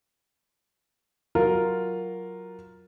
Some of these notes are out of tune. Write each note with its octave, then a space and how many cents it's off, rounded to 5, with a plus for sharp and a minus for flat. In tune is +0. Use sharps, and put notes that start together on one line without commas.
F#3 +0 F4 +0 A#4 +0